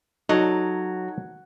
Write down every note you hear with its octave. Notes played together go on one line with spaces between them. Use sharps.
F#3 D#4 A4 D#5